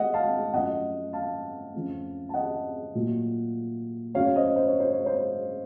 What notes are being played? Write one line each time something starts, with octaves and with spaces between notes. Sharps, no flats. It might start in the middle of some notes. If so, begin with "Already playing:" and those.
Already playing: A3 D#5 F#5
F5 A5
F#2 F3 A3 D#5 F#5
F5 A5
F2 C#3 F3 A3
A5
D#5 F#5
A#2 F#3 A3
F#2 C#3 F#3 A3 C#5 F5
C5 D#5
C5
C#5
C5
C#5
C5